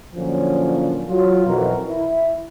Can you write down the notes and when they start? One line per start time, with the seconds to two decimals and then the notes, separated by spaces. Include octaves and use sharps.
0.15 A#2 D3 F3 F#3 A#3 C#4
1.09 F#3 F4
1.46 B1 F2 B2 E3 F#4 A#4
1.88 E4